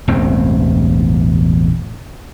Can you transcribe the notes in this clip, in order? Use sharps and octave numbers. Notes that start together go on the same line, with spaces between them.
E1 A1 G2 C4